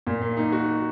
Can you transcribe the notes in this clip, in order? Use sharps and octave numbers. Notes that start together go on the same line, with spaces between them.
A#2
A#3
D#4
F#4